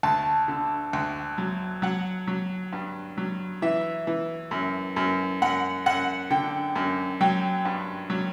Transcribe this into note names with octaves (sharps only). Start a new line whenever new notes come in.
D2 A5
D3
D2
F#3
F#3 F#5
F#3
G2
F#3
E3 E5
E3
F#2
F#2
F#2 F#5
F#2 F#5
D3 G5
F#2
F#3 G5
G2
F#3